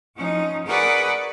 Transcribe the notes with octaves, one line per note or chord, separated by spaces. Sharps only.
F3 C#4 D#4
F#4 G#4 A#4 B4 D5 F#5